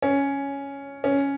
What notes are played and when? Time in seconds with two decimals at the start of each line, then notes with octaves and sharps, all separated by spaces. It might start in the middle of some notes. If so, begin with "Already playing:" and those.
0.02 C#4
1.04 C#4